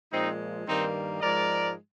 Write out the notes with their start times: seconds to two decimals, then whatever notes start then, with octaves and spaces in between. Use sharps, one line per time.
0.12 A#2 F3 G#3 C4 D#4
0.67 G2 D#3 G3 A#3 C4 D#4
1.21 G#2 F3 G#3 A#4 D5